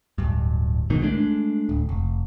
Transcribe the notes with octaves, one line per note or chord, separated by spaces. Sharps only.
D1 G2
B1 G#2 B2 D#3
G#3 A3 D4
D1
F1